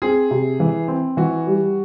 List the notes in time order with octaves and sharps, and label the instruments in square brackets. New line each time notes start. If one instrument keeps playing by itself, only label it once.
[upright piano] C4 [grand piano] G#4
[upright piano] C3
E3
C4
[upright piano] E3 [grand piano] F#4
[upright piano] G3